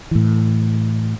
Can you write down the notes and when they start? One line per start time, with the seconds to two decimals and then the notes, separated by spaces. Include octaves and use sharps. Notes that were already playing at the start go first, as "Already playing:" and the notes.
0.11 A2 E3